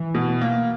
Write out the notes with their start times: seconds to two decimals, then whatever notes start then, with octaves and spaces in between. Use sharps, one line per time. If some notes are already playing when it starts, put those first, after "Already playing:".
Already playing: E3
0.15 B2
0.41 A#3